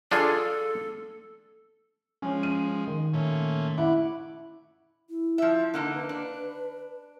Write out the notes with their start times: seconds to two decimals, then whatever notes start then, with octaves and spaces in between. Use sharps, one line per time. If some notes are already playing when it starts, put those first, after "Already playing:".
0.12 D4 F4 G#4 A4
2.22 F3 G#3 C#4
2.43 D#7
2.88 D#3
3.13 A#2 A3 C#4
3.78 E4 F#5 D6
5.09 E4
5.38 F3 E5
5.74 D3 A#3 D#4
5.94 B4
6.09 D4